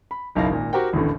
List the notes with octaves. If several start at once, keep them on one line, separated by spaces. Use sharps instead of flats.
B5
F#1 B1 D#4 E4 F5 A#6
G#1 A#2
F#4 G4 A#4 C5 F#5 G5
A1 D#2 A2 D3